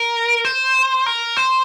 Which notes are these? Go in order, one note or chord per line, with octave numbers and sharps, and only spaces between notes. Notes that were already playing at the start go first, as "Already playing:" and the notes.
Already playing: A#4
C5
A#4
C5